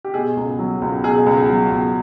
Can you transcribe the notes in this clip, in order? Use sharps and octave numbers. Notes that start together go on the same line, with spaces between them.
G4
B2 G#4
C#2
F#3
C#2
B2 G#4
C#2
F#3
C#2